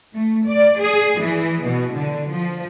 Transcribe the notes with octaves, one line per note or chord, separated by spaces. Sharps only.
A3
D5
G#4
E3
B2
D3
F3